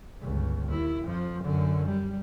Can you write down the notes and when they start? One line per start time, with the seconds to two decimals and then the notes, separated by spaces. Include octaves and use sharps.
0.22 G1 C#2
0.69 D#2 E4
1.04 F2 F3
1.43 F#2 D3
1.88 G3